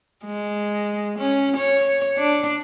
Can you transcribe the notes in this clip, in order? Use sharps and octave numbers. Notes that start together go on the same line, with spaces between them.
G#3
C#4
C#5
D4